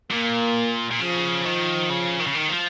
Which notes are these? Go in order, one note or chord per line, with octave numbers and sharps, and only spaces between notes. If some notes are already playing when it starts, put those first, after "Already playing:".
A#2 A#3
A#2
C#3 F3
D#3
C#3
D#3
C#3
D#3
F3